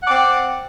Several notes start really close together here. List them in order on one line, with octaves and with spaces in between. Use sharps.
F#5 D5 C4